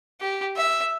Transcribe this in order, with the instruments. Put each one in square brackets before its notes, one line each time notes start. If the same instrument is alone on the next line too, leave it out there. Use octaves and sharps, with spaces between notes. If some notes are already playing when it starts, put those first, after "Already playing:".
[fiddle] G4
E5